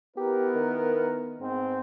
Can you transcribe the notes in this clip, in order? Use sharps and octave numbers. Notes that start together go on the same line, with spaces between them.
B3 E4 G4 A#4
D#3
G#2 B3 C4